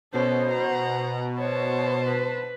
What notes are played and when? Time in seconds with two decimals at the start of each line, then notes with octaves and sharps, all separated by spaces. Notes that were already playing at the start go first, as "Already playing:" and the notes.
0.14 B2 C#4 A4 C5
0.50 F#5 A#5
1.40 C5 C#5 A5
2.06 B4